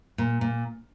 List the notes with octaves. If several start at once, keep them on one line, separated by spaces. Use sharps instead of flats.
A#2
A#2